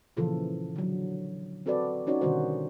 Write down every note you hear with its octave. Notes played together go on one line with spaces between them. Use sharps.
A#2 C#3 E3 F3 F4 A4
D3 F#3
C4 F#4 A4 B4 D5
C#4 D#4 F#4 C#5 D5
B2 D3 D#3 G3 F#4 C5